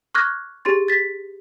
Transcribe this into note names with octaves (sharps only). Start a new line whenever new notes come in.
C#6 D6 F6 F#6 G#6 A#6
G4 G#4 C6 A6
A6 B6